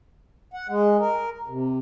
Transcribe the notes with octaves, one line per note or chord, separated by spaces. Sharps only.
F#5
G#3
A#4
C3